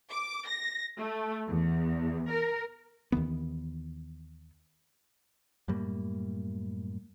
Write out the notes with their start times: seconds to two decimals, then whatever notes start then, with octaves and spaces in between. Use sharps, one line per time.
0.10 D6
0.47 A#6
0.97 A3
1.47 E2
2.30 A#4
3.12 D#2 D#3 E3 B3
5.68 F#2 A2 G3 A#3